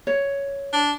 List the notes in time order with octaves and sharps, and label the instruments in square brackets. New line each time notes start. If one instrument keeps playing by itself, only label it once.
[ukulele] C#5
[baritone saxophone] D4